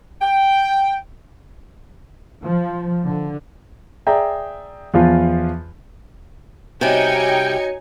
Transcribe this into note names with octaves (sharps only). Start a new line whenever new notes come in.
G5
F3
D3
G#4 D5 E5 G5 A#5
E2 F3 F4
C3 G3 D#4 F#4 C#5 G5 G#5 C#7